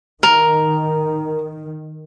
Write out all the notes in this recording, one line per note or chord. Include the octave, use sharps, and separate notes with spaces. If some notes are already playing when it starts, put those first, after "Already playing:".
D#3 A#4